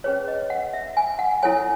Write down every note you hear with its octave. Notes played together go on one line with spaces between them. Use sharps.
C#4 G#4 B4 C#5
D#5
F#5
E5
G#5
F#5
E4 A4 C#5 G#5